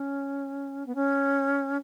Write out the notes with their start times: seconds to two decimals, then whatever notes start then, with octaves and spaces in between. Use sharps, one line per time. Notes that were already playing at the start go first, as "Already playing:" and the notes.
Already playing: C#4
0.86 B3
0.95 C#4